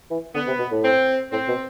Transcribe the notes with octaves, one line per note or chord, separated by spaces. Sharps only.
E3
D3 B3
C3
B2
A2
C4
A2 C4
B2